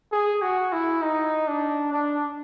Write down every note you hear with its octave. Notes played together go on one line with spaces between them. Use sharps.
G#4
F#4
E4
D#4
D4
D4